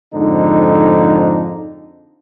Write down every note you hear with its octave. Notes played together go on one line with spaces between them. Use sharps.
F2 G#2 D3 D#4